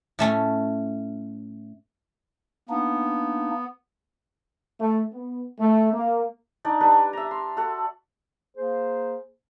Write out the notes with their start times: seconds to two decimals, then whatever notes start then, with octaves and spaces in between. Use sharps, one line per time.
0.19 A2 A3 C#4
2.69 A#3 B3 D4 D#4
4.79 A3
5.12 B3
5.59 A3
5.93 A#3
6.65 D4 D#4 D5
6.81 G3 D4 B4
7.13 E5 A#5
7.31 C6
7.57 F#4 A4 F#5
8.57 A#3 G#4 C5